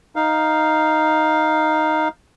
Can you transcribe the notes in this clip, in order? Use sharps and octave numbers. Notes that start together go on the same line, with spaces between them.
D#4 F5